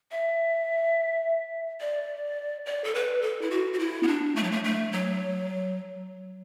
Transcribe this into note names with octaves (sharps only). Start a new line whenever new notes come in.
E5
D5
D5
A4
B4
A4
E4
F#4
F#4
E4
B3
D4
A3
F#3
A3
A3
F#3